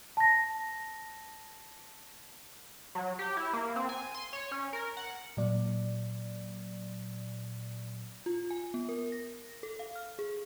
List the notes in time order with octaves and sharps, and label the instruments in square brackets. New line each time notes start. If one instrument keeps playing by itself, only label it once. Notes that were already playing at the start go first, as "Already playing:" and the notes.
[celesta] A5 A#6
[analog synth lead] F#3
G4
E4
A#3
C4
G#5
C6
C#5
C#4
A#4
F#5
[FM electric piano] A#2 F#3 D5
[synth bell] F4
G#5
B3
A#4
A#6
A4
F5
F6
G#4